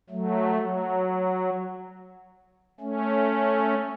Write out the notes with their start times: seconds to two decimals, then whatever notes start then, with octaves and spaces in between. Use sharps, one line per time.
0.10 F#3 A3
0.55 F#3
2.80 A3 C#4